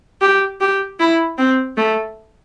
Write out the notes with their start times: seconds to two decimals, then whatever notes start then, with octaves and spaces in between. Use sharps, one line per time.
0.21 G4
0.61 G4
1.00 E4
1.38 C4
1.77 A3